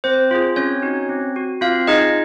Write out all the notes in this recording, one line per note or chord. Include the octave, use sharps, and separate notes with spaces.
C4 C5
F4 G#4
C4 C#4 C#5
D#4 F#4
C4
F#4
C4 F4 F5
D#4 F4 G#4 D#5